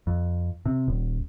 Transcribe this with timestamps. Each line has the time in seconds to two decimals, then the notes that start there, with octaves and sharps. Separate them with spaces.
0.07 F2
0.66 C3
0.88 D#1